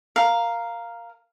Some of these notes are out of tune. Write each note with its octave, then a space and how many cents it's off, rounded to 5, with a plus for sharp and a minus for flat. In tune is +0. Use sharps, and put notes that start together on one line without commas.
A#4 +0 F5 +0